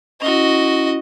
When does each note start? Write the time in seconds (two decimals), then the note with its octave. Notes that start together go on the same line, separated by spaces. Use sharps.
0.22 C#4 E4 F#4 D#5